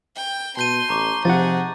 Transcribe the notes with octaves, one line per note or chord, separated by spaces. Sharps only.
G5
B2 A5 C6 G6 D#7
A1 A#5 C#6 D6
C3 F3 D#4 G#4 F#5 A6